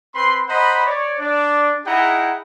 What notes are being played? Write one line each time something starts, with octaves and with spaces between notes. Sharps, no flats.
C4 B4 B5 C6
C5 D#5 F#5 A#5 B5
C#5 D5
D4 D5
D#4 E4 G#4 F#5 G5 A#5